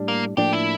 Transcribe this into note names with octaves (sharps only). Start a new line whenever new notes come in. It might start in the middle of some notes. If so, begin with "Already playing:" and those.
Already playing: A2 G3 D4
A#3
A2 F3 A#3 D4 G4
E4